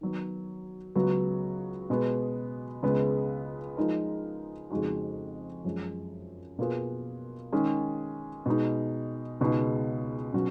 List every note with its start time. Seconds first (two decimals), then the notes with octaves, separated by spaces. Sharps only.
0.01 D#3 F#3 B3
0.95 C#2 C#3 F#3 B3 F#4
1.90 B2 G#3 B3
2.83 C#2 C#3 G#3 B3
3.77 F3 G#3 D#4 A#4
4.70 F2 C#3 G#3 D#4 F#4
5.64 F#2 F3 G#3
6.59 B2 A#3 F4 G#4 B4
7.52 D#3 G#3 C#4 G#4
8.46 B2 G#3 D#4
9.40 C#2 B2 G#3 D#4
10.34 B2 F#3 C#4 F#4